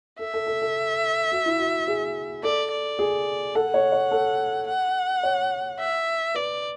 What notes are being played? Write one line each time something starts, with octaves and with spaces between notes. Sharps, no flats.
A4 E5
A4
A4
A4
F#4
E4
F#4
G#4
A4 D5
D5
G#4
A4 F#5
C#5
C#5
A4
F#5
C#5
E5
B4 D5